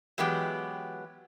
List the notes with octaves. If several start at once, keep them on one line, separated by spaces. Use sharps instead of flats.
E3 F#3 G#3 B3 G4 G5